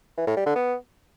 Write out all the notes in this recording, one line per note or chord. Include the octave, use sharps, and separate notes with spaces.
E3
A2
G3
D3
B3